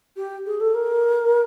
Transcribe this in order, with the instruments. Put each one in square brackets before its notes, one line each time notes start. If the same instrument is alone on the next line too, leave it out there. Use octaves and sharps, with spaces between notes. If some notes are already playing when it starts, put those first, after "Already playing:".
[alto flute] G4
G#4
A4
A#4